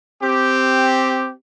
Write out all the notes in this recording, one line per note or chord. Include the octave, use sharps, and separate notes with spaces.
C4 G4